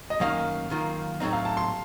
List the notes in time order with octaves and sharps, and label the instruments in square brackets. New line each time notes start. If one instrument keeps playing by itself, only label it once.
[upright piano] D#5
[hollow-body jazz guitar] F#2 D#3 A#3 C#4 [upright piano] F5
[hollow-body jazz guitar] F#2 D#3 A#3 F4
A2 F#3 A3 C4 D#4
[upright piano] F5
A5
C6